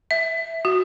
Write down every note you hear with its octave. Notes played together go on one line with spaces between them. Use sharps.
E5
F#4